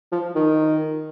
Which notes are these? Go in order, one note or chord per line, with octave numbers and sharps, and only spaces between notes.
F3
D#3